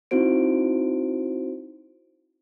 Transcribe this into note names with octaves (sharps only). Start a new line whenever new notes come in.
C4 D#4 E4 F#4 C5 D7